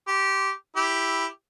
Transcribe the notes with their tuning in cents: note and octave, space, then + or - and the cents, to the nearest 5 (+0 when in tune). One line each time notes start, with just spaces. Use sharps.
G4 -15 C6 +0
E4 +0 G4 +0